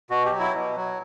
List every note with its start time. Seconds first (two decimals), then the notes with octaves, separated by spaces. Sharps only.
0.10 B2 F#4
0.25 G4
0.32 F#3
0.39 E4
0.54 B2
0.76 F#3